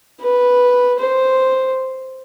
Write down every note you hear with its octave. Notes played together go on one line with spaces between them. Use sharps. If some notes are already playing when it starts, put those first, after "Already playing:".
B4
C5